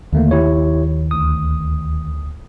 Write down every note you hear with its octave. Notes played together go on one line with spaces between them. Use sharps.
D#2 D3 A3 A#3
E4 G4 C#5
D2 D#6